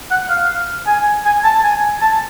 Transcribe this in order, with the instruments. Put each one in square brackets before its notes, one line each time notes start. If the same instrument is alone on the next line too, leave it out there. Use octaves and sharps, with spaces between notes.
[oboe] F#5
F5
G#5
G#5
A5
G#5
A5